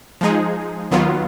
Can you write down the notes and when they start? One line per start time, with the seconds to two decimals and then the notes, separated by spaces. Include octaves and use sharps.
0.21 F3 G#3 D#4 G#4
0.91 D#2 D#3 F#3 B3 F4